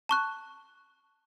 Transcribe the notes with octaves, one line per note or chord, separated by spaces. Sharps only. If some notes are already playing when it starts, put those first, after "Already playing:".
A5 C#6 F#6